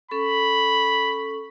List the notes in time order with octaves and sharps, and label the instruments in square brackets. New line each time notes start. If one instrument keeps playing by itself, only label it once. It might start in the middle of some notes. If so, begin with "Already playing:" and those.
[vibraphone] C#4 A4 C#6 [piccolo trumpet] B5